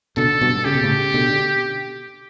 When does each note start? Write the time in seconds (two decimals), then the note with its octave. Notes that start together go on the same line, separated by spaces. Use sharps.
0.17 B2 D3 A4
0.41 G2 B2
0.65 C#3 G4
0.75 B2
0.83 A2 C#3
1.14 B2 D3